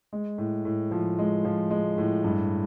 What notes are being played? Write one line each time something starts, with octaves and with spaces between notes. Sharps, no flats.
G#3
A2
A2
F3
G#3
F3
G#3
A2
G2